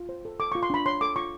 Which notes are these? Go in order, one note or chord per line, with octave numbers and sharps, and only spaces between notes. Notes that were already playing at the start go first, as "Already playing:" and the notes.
Already playing: F4
C5
A4
A4 D6
F4 C#6
C6
D4 B5
C#5 C6
A4 D6
F4 C#6